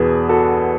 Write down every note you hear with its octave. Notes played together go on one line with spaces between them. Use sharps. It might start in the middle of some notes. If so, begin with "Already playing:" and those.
Already playing: E2 B2 G#4 B4
F#4 A4